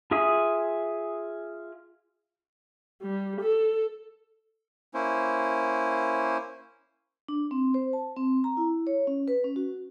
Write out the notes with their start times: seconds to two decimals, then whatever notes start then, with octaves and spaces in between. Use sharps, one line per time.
0.11 F4 G#4 E5 G#5 D#6
3.02 G3
3.41 A4
4.94 A#3 C#4 E4 C5
7.29 D4
7.51 C4
7.74 C5
7.93 A5
8.16 C4
8.44 A#5
8.57 E4
8.87 C#5
9.07 C#4
9.28 B4
9.44 C#4
9.56 F#4